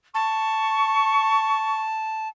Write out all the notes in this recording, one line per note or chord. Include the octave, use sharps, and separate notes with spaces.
A5 C#6